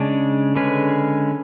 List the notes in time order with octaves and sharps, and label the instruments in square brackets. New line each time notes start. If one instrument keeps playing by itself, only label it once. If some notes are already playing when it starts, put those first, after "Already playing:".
Already playing: [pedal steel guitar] C#3 G#3 D4
D3 G#3 C#4 G#4 B4